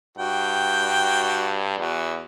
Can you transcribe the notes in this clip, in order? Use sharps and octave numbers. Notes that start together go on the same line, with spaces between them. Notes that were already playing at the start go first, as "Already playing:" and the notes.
G2 F#4 G5
E2 F#4